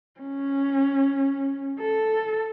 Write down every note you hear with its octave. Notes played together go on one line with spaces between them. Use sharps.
C#4
A4